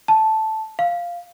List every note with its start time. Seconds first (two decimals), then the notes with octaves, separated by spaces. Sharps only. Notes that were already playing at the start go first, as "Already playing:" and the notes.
0.08 A5
0.79 F5